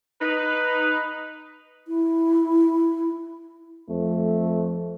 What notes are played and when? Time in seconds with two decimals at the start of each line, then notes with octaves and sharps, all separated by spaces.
0.21 D#4 B4
1.88 E4
3.89 F2 A3